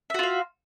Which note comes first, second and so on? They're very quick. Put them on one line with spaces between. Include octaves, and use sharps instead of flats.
E5 F#4 F4 F5